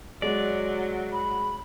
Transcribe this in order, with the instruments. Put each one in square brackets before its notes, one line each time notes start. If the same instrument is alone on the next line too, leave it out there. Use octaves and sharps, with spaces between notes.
[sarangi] F#3 [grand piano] G#3 [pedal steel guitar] D5
[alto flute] B5